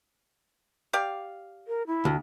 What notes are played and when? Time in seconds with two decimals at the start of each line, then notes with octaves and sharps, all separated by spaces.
0.93 G4 D5 F5
1.68 A#4
1.87 E4
2.05 D2